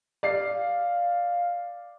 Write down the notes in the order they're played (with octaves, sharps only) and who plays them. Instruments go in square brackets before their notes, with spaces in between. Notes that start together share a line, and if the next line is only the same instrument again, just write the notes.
[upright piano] D5 C7 [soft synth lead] F5